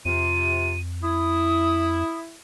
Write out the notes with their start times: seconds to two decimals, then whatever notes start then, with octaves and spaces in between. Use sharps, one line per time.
0.05 F2 C3 F4 D#7
1.03 E4 D#6